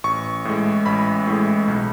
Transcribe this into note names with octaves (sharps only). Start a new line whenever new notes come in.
A1 C#6
A2 G#3
A1 B5
A2 G#3
B1